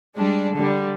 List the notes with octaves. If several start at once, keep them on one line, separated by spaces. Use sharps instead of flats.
G3 G#3 D4
D3 G3